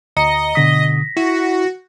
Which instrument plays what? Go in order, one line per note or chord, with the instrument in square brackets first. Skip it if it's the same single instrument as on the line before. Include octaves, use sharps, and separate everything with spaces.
[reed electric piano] D2 [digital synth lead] D#5 [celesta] A#5 C#7
[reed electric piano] B2 D3 D#6 [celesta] A#6 B6
[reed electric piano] E4 [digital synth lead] F#4